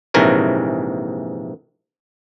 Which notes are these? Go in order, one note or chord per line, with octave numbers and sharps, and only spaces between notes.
A#1 G#2 C3 E3 A#4 C#5